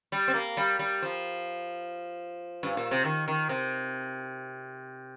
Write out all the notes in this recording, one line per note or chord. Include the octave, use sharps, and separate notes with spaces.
G3
C4
A#3
G3
G3
F3
G2
A#2
C3
D#3
D#3
C3